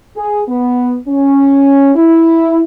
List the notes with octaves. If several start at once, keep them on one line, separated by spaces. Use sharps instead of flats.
G#4
B3
C#4
E4